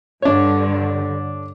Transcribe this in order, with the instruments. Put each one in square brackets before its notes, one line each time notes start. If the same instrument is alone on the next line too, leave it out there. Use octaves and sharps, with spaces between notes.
[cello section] G2 D3 [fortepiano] D4 C#5